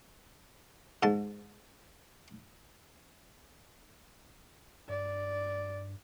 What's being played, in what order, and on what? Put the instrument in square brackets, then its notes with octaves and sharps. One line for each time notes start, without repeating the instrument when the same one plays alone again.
[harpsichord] G#2 A5
[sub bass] G2 [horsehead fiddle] D5